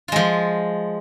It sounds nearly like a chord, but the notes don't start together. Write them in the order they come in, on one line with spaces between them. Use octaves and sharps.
F4 G#3 F3